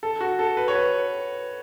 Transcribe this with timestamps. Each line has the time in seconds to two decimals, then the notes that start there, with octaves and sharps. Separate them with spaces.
0.03 A4
0.21 F#4
0.39 A4
0.57 B4
0.68 C#5
0.75 B4